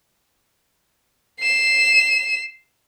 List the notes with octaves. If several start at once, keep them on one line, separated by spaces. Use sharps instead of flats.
C7 E7